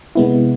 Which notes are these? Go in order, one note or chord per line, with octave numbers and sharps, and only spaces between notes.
C3 G#3 B3 E4